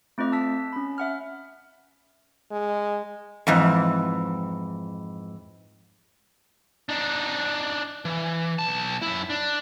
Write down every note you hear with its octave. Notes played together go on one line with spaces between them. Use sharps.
A3 C4 F4 D#5
A5 E6 B6
C#4 B5
E5 F#5 F6
G#3
F2 G#2 E3
D4 D#4
E3
B1 A5
F#2 E4
D4